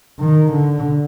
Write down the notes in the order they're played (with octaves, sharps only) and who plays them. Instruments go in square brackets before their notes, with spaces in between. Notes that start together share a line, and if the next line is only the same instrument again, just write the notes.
[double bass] D#3
D3